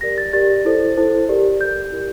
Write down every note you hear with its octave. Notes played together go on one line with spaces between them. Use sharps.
G4 A#4 D5 A#6
A6
G4 A#4 D5 A6
E4 A4 C5
E4 A4 C5
G4 A#4 D5
G4 A#4 D5 G6
E4 G4 A#4 D5